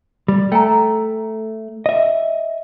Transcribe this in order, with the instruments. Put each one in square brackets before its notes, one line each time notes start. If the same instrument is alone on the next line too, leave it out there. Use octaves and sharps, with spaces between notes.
[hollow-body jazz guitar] G3
[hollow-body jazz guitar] A3 [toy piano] G5 G#5 A#5
[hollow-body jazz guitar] D#5 E5